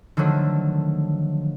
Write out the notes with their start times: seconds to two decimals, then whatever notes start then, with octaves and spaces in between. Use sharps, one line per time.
0.17 D3 D#3 F3 F#3 A3